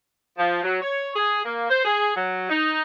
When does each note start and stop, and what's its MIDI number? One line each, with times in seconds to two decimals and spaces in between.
0.37 0.61 53
0.62 0.76 54
0.81 1.09 73
1.15 1.40 68
1.44 1.67 58
1.68 1.80 72
1.84 2.14 68
2.16 2.46 54
2.49 2.82 63